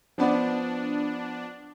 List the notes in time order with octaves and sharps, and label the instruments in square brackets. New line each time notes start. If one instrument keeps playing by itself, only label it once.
[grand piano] F3 B3 D5 [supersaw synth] D4